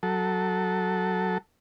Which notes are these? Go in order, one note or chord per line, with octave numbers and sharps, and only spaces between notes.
F#3 A4